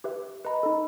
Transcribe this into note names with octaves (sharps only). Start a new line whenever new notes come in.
G4 B4 E5
B4 D#5 A#5 B5
D#4 A4